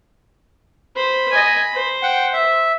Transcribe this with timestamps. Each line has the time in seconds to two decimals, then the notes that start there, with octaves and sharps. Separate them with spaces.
0.96 C5 B5
1.31 D#5 G#5
1.73 C5
2.02 F#5 G5
2.33 E5